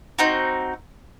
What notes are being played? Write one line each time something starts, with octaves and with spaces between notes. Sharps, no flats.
C4 D#4 F#4